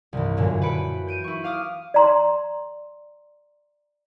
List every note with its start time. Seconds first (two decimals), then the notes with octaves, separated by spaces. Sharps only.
0.13 C2 G2 E3
0.37 F#2 A#2 D3 E3
0.61 B4 B5 F#6 C#7 D7
1.07 G6 D7 D#7
1.24 E4 C#6
1.44 F5 D6 D#6 F6
1.94 D5 A#5 C6